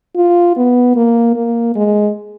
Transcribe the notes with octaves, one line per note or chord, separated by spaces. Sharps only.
F4
B3
A#3
A#3
G#3